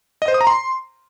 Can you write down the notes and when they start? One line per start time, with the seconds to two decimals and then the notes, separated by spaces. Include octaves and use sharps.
0.22 D#5
0.28 C5
0.34 D#6
0.41 A#5
0.47 C6